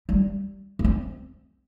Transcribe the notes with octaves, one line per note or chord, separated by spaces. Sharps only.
G3
A#3
C4